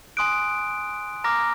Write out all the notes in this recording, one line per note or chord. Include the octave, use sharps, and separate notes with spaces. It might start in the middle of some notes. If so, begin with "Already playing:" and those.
G#5 C6 D#6 F#6 D7
A#5 D6 F6 A#6